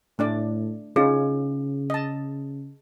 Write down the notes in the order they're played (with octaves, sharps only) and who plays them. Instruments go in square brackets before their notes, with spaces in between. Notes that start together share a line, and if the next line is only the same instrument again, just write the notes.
[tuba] A2 [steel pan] A3 D4 D5
[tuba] C#3 [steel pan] C#4 D#4 F4 [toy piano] G#4
[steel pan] D#5 A5